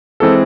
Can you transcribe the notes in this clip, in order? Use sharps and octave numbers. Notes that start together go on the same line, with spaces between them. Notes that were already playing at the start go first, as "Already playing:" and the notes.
E3 G#3 C4 A4